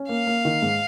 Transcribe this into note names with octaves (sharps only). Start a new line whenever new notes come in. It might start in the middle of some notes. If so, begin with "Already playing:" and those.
Already playing: C#4
A#3 F5
A#3
D#3
G#2